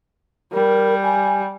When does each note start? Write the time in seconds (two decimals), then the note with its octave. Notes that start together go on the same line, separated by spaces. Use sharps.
0.53 G3 A#4
1.03 G#5